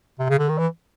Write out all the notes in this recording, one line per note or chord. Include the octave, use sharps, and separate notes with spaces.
C3
C#3
D3
D#3
E3